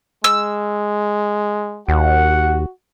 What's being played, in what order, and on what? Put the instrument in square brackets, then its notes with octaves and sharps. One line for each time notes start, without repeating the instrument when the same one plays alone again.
[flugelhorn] G#3 [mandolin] E6
[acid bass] D#2 [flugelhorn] F#4 [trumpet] F#5